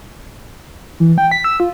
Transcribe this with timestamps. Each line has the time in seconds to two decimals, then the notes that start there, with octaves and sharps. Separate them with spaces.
1.00 E3
1.18 G5
1.32 B6
1.44 E6
1.60 F4